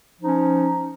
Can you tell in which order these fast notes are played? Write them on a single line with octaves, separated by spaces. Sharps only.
F3 D#4 C#4